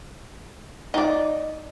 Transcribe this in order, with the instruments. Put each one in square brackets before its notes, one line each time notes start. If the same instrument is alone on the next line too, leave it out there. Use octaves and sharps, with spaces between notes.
[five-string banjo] D#4 D5